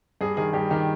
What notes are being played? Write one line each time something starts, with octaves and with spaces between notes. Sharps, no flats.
G2 G#4
D#3 G#4
G2 G4
D#3 G4